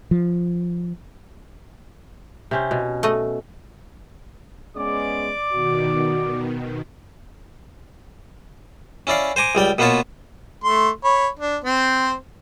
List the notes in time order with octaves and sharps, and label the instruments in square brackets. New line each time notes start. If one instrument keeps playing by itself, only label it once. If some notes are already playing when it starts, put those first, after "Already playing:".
[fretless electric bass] F3
[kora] C3 C#4 C5
B2
[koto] A3 D#5
[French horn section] G#3 B3 C#4 [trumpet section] D5 D6
[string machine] B2 D#3 [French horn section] F#4
[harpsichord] C#4 E4 D5 F5
C5 G#5 A#5 D6
C#2 G3 D5 G5
B2 A#3 B3 F4 C#5 A5
[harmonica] A3 C6
C#5 B5
D4
C4 C5